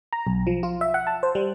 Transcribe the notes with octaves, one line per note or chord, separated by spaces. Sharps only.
A#5
B1
F3
F4
E5
F#5
A5
C5
G3